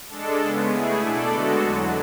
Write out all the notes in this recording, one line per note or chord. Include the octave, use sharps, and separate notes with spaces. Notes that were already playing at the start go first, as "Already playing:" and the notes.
G#3 D4 A4
C#3 G#3 B3
A3 E4 G#4
B2 A3 D4 A4 D5
D3 G#3 B3 F#4 A4
E2 D3 F#3